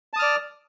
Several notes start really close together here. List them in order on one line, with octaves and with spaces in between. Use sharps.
A5 D#6 F6 D5